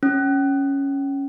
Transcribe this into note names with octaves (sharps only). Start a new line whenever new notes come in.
C#4